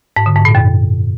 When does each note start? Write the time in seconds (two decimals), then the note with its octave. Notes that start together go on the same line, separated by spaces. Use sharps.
0.16 G#2
0.26 D3
0.36 G#2
0.45 A#2
0.55 F#2